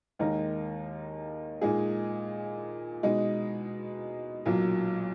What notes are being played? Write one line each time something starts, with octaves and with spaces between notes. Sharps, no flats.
D#2 D#3 G#3 D#4 A#4
A#2 G#3 D#4 G#4
B2 G#3 D#4
B1 A#2 F#3